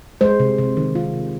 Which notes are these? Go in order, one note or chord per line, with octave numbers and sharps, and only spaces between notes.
G#3 C5
C3
C3
D#3
G#3 F4
C3